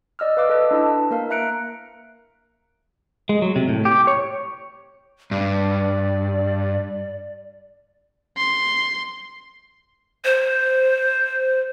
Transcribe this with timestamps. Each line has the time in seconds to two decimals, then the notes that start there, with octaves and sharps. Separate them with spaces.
0.19 D5 D#5 E6 F6
0.37 B4 F5 D6 E6
0.49 A4 B4 D#5
0.71 D4 E4 A5
1.11 A#3 A#4 F5
1.30 E5 A#5 F#6 C#7 D7
3.29 G#3
3.42 F#3
3.56 C3
3.69 A2
3.85 G4
4.07 C#5
5.31 G2 D5
8.37 C6
10.25 C5